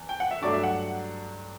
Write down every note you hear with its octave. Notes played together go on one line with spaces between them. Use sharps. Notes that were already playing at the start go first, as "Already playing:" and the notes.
Already playing: E2
G5
F#5
E5
G2 F#3 A3 D4 D5
E5
F#5